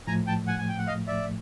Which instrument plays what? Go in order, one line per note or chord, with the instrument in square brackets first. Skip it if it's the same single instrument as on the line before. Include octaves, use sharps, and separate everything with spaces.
[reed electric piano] A2 F3 A3 [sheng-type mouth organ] G#5 A#5
[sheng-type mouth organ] G5 A5
F#5 G#5
G#5
G5
F#5
D#5 F5
D5 E5